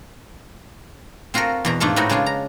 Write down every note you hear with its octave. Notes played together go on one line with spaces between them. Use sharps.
C4 F4 F#4 A4 A#4
E2 B2 A#5
G#2 A3 D4 F4 A4
A2 B3 C4 D#4 F#4
C#3 G#3 D4 F4
A#5